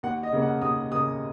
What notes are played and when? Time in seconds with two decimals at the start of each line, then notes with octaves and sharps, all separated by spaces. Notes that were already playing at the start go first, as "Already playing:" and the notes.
0.03 D#2 F#5
0.23 D#5
0.32 C#3 A#3
0.42 F#5
0.61 D#2 D#6
0.92 C#3 A#3 D#6